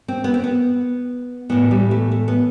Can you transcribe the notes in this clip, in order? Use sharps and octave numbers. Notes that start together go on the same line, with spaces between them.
C4
B3
C4
B3
A2 E3 B3
G3
A3
A3
B3